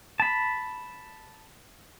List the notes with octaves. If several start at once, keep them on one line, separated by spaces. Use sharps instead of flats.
A5 B5